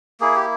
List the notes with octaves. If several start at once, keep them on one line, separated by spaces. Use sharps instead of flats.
A#3 E4 G#4
G4